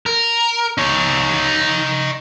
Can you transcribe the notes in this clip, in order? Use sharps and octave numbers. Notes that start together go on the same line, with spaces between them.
A#4
D#4 C#5